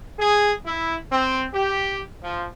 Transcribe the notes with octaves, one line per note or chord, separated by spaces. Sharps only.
G#4
E4
C4
G4
F3